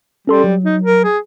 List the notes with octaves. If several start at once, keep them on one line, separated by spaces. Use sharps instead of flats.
G3 C#4 A4 C6
F#3
D#4
A#4
G#4